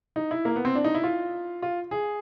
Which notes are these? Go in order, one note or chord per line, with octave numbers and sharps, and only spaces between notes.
D#4
E4
A#3
B3
C4
D4
D#4
E4
F4
F4
G#4